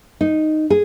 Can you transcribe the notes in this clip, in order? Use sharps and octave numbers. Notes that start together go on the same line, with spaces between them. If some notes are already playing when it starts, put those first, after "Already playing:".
D#4
G#4